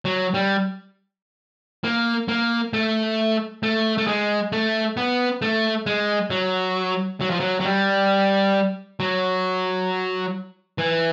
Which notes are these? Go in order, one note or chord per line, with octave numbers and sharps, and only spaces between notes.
F#3
G3
A#3
A#3
A3
A3
A3
G#3
A3
B3
A3
G#3
F#3
F#3
F3
F#3
F#3
G3
F#3
E3